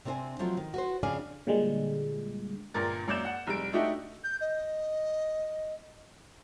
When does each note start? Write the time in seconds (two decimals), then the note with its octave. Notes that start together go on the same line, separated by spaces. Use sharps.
0.05 C3 C4 D4 A4 C5 G#5
0.39 F3 F#3 A3 C4 F4
0.57 D#3
0.74 F#4 B4 C5
1.03 F2 C#3 D4 D5 F5 G#5
1.47 A#2 D3 G3 G#3
2.74 G1 A#2 A#4 A6
3.07 F#2 A#3 D5 G6 E7
3.25 F#5
3.47 F1 G3 D7
3.73 A3 D4 D#4 F#4 G4 E5
4.24 G6
4.41 D#5